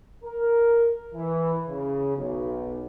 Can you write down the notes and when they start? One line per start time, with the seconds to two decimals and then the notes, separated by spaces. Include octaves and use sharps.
0.24 A#4
1.14 E3
1.68 C#3
2.15 B1